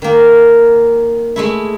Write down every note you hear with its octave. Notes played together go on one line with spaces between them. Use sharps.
D#3 A#3
G#3 A3 E4